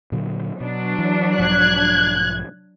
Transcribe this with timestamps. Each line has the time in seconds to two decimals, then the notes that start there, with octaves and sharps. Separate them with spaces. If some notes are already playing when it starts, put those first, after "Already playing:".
0.12 A#2 D3 F#3
0.60 B2 F#3 D4
0.98 E3
1.38 B1 G#2 F3 F#6 G#6